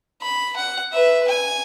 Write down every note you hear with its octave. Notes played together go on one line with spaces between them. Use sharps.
B5
F#5
B4 E5
G#5